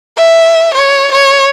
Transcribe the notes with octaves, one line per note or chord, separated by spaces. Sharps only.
E5
C#5
C#5